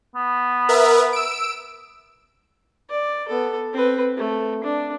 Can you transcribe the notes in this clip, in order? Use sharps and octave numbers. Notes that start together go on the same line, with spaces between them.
B3
A#4 B4 E5
E6 D7
D5
B3 A4
C4 B4
A3
D4